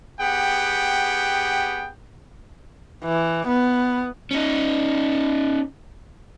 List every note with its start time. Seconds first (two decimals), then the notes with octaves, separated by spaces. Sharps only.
0.20 B3 G4 G#4 F#5 G5
3.04 E3
3.48 B3
4.31 C#4 D#4